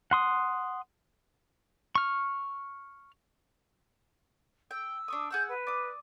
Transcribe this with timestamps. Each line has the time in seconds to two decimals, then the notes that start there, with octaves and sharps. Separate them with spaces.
0.11 F#5 C6 D#6
1.95 C#6 F6
4.71 G5 E6
5.08 D4 C#6 D#6
5.31 G#4 F#5 E6 G6
5.48 B4
5.67 D5 D#6